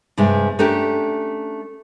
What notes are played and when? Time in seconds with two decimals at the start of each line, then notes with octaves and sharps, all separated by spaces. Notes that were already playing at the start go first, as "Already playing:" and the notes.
0.18 G2 C3 G#3
0.59 A3 C#4 D4 G4 A#4